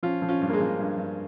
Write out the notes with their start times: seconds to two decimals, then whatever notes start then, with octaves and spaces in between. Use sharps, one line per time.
0.03 F3 C#4 F4
0.22 F3
0.29 C#4 F4
0.41 G2
0.50 A#3
0.53 G#3
0.60 F3
0.80 G2
0.98 G2